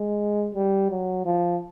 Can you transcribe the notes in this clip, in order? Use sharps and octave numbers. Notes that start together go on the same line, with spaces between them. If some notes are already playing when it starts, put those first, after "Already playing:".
Already playing: G#3
G3
F#3
F3